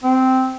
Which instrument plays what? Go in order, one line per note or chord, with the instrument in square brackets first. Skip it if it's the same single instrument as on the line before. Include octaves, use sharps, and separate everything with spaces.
[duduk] C4